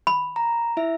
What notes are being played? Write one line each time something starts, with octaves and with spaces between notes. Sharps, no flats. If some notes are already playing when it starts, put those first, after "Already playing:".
B5
A#5
E4 E5